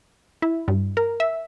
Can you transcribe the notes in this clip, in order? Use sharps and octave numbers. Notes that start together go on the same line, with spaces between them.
E4
G2
A#4
E5